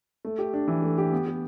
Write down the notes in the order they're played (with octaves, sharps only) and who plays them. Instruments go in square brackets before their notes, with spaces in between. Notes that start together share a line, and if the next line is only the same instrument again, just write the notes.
[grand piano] A3
G4
D4
E3
A3
G4
B3
G4